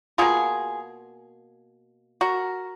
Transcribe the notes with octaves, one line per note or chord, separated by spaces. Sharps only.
B2 A#3 F4 G#4
F#4 A#4